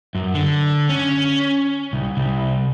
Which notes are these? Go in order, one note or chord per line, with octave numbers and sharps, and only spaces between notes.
F#2
D3
C#4
C2
C2